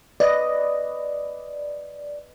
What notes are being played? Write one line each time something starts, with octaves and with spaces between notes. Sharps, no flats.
B4 D5 D#5